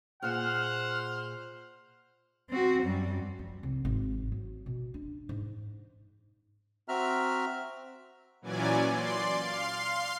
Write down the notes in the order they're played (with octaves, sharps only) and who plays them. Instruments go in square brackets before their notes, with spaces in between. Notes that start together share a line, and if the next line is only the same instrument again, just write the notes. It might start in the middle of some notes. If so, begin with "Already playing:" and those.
[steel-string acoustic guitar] A#2 G#4 [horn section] C5 [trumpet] F#5 [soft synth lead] F6
[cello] C4 F#4
F#2 G3
[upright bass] F3
C2
G#1
F#3
B2
D4
G#2
[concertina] C4 F#4 E5 A#5 F6
[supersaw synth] A#2 E3 F#3 C#4 D5 G#5
D5 C6
F5 C6 C7